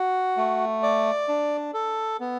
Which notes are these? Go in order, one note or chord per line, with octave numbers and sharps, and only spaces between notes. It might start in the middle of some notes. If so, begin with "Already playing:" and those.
Already playing: F#4
A3
D5
D4
A4
B3